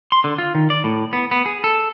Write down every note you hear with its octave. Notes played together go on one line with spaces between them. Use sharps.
C6
D3
F4
D#3
D5
A2
B3
B3
G#4
A4